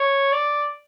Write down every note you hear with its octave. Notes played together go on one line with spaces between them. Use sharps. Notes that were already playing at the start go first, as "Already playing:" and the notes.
Already playing: C#5
D5